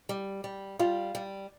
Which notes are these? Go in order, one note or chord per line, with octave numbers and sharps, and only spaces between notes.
G3
G3
G3 F4
G3